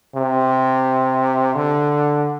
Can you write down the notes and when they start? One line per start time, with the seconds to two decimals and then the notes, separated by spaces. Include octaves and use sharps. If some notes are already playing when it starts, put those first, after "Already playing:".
0.16 C3
1.55 D3